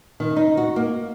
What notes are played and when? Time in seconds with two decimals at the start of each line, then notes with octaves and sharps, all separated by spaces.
0.20 D#3
0.36 D#4
0.57 F#4
0.76 A#3